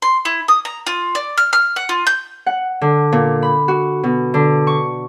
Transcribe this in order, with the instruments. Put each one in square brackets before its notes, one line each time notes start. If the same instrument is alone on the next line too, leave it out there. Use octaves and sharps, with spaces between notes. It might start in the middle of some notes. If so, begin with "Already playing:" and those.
[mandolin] C6
E4
D#6
A#5
F4
D5
F6
F6
F#5
F4
G6
[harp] F#5
D3
A#2
B5
F#4
B2
D3
C#6